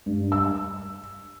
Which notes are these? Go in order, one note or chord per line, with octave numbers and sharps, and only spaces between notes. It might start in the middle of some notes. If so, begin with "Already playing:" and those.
G2
E6